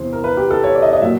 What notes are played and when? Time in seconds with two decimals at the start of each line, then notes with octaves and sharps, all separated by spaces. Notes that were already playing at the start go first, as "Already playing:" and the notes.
Already playing: E2 C3 E3 C5
0.13 A#4
0.24 B4
0.37 G4
0.51 A4
0.64 C#5
0.75 D5
0.82 D#5
0.93 D#5
1.02 A#2 F#3 E5